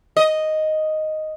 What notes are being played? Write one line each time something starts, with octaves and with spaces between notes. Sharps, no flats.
D#5